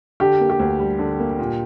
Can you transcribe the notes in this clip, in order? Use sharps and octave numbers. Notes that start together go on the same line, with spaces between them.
D3 G4
A#3
G4
D2
G3
D3
A#3
A#2